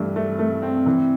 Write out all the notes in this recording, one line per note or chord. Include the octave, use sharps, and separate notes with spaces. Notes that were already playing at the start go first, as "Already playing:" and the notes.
Already playing: G2 E3 A3
A3
A3
C4
E3